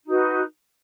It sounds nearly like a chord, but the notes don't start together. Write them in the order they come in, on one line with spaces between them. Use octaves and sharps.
D#4 F#4 B4